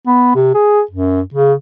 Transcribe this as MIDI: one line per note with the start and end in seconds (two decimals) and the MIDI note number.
0.07 0.32 59
0.35 0.53 48
0.54 0.82 68
0.91 1.21 42
1.34 1.54 49